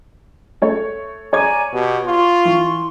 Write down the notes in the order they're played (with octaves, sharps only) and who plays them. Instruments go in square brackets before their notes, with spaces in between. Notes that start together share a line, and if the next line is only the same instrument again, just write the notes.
[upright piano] A3 C#5
[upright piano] C#5 D6 G#6 [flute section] D5 G#5 A#5
[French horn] B2 [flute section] G4
[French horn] F4 [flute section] C6 C#6
[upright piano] E3